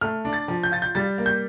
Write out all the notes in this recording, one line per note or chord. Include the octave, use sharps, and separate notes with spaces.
A3 F6
D4
A6
F3
G6
F4 A6
G6
G3 A6
A#3
G6